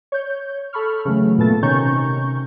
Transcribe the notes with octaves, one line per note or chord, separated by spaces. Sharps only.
C#5 G6
A4 B5 C#6 F6
C#3 E3 F#3 A3
A#2 A3 B3 A4 A5 A6
C3 D#3 C#4 A#5 C#6 G6